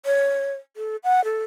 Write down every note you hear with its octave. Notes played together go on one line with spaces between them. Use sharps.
C#5
A4
F#5
A4